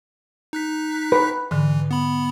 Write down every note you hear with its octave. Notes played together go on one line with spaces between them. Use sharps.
D#4 F#6 B6
B4
G#2 D3 E3
B3 B5